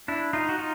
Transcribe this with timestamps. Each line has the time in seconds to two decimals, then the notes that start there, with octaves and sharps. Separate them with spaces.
0.08 D4 E4
0.33 D#4 F4
0.49 F#4
0.59 D#4 F4